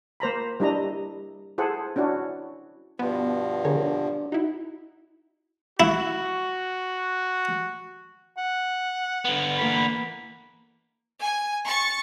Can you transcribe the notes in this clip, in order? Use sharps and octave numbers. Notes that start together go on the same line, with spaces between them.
A#3 C5 A#5 B5
G3 D4 E4 D#5 A#5
E4 G#4 A4 C5 F#5
C#4 D4 E4 F#4
G2 B2 F3 B3
D3 G#4 A#4 C#5
D4
D#4 E4 F#4
E4 F#4
F#5
D3 B3
E3 A#3 B5
G#5
C#6 A6